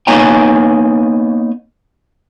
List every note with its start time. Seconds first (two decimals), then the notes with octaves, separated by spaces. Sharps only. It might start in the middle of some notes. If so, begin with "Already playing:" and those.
0.07 A#3 B3 D#4 C#5 G#5 A#5